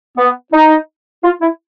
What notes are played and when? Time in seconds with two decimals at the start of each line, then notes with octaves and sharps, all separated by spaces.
0.17 B3
0.52 D#4
1.23 F4
1.41 E4